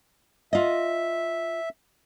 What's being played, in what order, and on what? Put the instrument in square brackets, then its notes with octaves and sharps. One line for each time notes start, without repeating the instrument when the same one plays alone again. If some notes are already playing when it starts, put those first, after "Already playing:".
[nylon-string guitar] F4 D#5 [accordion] E5